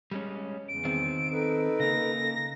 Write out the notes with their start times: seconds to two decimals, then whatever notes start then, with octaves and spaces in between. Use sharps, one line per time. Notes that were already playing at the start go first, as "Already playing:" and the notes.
0.11 G3 G#3 C#4
0.69 E2 C#3 D7
0.85 D#3 C4
1.32 D#4 A4 B4
1.79 C#3 A#3 A#6